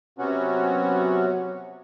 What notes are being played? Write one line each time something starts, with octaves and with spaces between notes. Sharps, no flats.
C3 F#3 B3 C#4 F#4